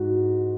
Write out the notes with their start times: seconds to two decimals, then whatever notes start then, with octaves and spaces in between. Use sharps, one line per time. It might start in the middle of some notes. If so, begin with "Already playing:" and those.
Already playing: G#2 F#4